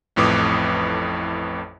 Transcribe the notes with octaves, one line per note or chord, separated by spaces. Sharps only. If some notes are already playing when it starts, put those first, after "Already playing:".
A1 F2 A2 B4 D6 D#6